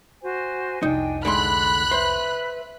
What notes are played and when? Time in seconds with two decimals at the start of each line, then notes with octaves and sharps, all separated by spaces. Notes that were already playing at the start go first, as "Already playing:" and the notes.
0.22 F#4 C5 G#5
0.83 C2 F2 D4 D#4 G5 G#5
1.25 D3 G#3 D4 E4 B5 C6 F#6
1.91 B4 C5 E5